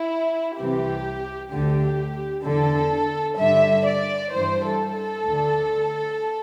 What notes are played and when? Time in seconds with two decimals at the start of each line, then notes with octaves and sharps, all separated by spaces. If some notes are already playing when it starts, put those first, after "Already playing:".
Already playing: E4
0.57 C2 C3 E3 G4
1.51 D2 D3 G4
2.44 E2 D3 A4
3.38 G2 D3 E5
3.85 D5
4.32 G2 E3 C5
4.63 A4
4.94 A4
5.26 D2 D3